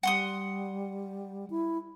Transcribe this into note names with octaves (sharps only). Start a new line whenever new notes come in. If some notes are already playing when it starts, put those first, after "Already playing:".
G3 F#5 C6 D#6
E4